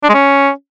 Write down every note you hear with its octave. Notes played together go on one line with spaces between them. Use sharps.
D4
G#3
C#4